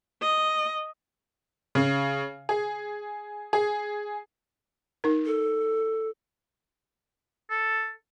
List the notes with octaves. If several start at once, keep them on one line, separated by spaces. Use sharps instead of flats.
D#5
C#3
G#4
G#4
D#4 A#4
A4
A4